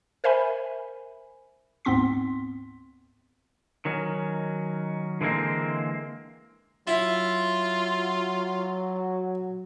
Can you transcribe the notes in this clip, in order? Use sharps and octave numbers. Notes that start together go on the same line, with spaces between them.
A#4 C5 E5 G#5 B5
D2 G#2 B3 C4 C6 B6
D#3 F#3 C#4
D3 E3 G3 G#3 A#3 C4
F#3 E4 F4